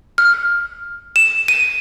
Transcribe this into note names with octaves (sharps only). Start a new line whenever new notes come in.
F6
E7
D#7